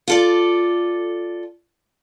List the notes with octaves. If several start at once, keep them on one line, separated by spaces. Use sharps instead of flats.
F4 A4 D5